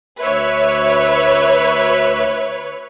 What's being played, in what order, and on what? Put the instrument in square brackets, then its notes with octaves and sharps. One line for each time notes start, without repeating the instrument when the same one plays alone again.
[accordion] D2 E5 [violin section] B4 C#5